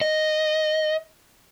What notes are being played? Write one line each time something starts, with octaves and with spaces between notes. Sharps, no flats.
D#5